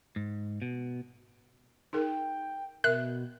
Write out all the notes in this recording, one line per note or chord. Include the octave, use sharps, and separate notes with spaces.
G#2
B2
D#4 G#4 A#4 G5
B2 A#4 E5 F#6